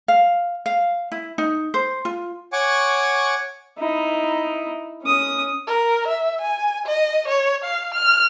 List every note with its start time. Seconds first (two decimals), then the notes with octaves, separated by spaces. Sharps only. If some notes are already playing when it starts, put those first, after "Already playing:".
0.08 F5
0.66 F5
1.12 E4
1.38 D#4
1.74 C5
2.05 F4
2.53 C#5 F#5 G#5 C#6 D6
3.79 D#4 E4
5.03 C#4 D#6
5.67 A#4
6.08 E5
6.41 G#5
6.86 D#5
7.28 C#5
7.64 F5
7.94 F6